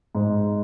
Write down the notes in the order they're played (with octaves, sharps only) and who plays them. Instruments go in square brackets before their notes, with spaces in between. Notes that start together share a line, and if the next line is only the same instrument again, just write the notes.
[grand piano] G#2